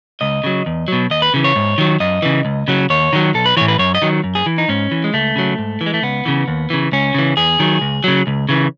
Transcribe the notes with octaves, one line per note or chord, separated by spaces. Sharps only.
C#2 D#5
C#3 F#3
E2
B2 F#3
D#2 D#5
B4
C#3 E3
C#5
G#2
D#3 F#3
F#2 D#5
C#3 E3
C#2
C#3 F#3
D#2 C#5
D#3 F#3
B1 A4
B4
A2 E3 C#5
B4
F#2 C#5
D#5
D#3 F#3
F#2
G#4
E3
D#4
G#2 C#4
E3
G#3
C#2 A3
C#3 F#3
G#2
E3
G#3
A3
C#2 B3
C#3 E3
D#2
C#3 E3
C#2 C#4
C#3 E3
E2 G#4
D#3 F#3
C#2
C#3 F#3
C#2
C#3 E3